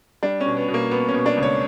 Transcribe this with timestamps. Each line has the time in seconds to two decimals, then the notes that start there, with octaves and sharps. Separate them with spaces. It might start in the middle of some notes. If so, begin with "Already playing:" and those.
0.23 G3 D4
0.40 C#4
0.46 B2
0.57 B3
0.68 B2
0.74 A#3
0.91 B2 B3
1.09 C#4
1.14 B2
1.26 D4
1.37 C#2
1.43 C#5